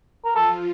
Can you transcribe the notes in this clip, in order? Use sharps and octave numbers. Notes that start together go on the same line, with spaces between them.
A#4
F3 F4 A4